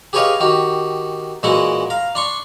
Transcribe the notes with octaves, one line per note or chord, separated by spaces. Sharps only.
G4 G#4 B4 C#5 D#5 F5
D#3 F#4 G4
A#2 E3 G#3 E4 F#4 F#5
F5 A#5
D4 C6 C#6